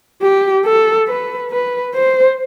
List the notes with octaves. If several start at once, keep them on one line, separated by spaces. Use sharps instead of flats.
G4
A4
B4
B4
C5